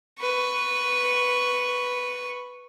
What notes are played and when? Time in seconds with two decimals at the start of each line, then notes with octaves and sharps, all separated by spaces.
0.20 B4 C#6